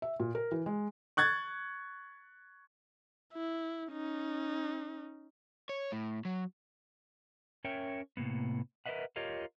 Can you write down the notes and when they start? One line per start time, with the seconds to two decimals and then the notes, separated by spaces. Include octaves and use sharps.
0.02 E5
0.20 A#2
0.35 A#4
0.51 E3
0.66 G#3
1.17 C#6 F#6 G#6 A6
3.34 E4
3.93 C#4 D#4
5.69 C#5
5.92 A2
6.25 F#3
7.64 C#4 A#4 C#5 E5 G5
8.17 A2 C3 A#3 B3
8.86 A#4 B4 C#5 D#5 E5 F#5
9.16 F4 G4 A#4 C#5 D#5 F5